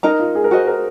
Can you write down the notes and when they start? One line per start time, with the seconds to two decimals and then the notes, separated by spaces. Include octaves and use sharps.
0.03 D#4 A#4 D#5 A#5
0.19 F4
0.35 G#4
0.44 A#4
0.51 F#4 G#4 C5 D#5
0.67 A#4